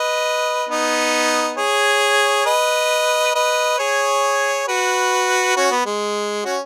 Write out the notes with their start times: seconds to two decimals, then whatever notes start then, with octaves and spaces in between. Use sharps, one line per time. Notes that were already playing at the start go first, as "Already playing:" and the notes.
Already playing: B4 D#5
0.69 B3 D#4
1.57 G#4 C#5
2.46 B4 D#5
3.35 B4 D#5
3.79 G#4 C#5
4.68 F#4 B4
5.57 C#4 F#4
5.71 B3
5.86 G#3
6.45 C#4 F#4